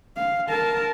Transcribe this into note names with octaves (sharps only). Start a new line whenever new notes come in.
F5
A#4 A5